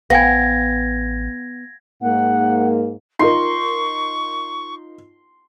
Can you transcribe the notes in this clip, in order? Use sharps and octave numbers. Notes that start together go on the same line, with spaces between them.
A1 B3 F5 G5 G#5 G#6 A#6
G#2 A#3 F#5
D#4 F4 A#4 C6 C#6